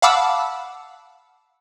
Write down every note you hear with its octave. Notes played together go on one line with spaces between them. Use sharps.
F5 F#5 A5 B5 D6 E6